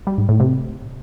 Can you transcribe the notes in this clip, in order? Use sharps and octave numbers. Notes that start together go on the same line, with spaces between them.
G3
G#2
A2
C3